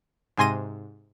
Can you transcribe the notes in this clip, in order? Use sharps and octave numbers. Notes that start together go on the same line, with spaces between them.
G#2 C3 G#5 C6 A#6 D#7